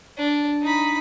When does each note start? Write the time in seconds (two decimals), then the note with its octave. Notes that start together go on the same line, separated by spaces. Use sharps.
0.18 D4
0.62 D#4 B5